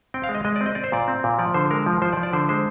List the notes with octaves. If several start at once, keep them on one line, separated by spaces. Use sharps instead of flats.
C4 G5
F5
G#3
D#5
G#3 D#5
D5
C4
D#5
C4 D5
C5
A#2 D5
C4
A#2
F3 D5
D3 C5
G#3 A#4
F3
F3 C5
D5
F3
D5
D3 C5
G#3 C5